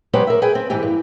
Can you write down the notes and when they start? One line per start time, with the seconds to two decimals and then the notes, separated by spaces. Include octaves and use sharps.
0.13 F#3 G#3 B3 G4 B4 C5
0.27 A#4 E5
0.42 G#4 B4 G5
0.55 C4
0.70 G#2 E3 C4 G4
0.83 G2